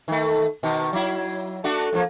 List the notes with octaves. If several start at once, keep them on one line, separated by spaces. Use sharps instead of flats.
D#3 A3
B2 D#3
F#3 E4
A3 D4 F#4
A2 F3 A#3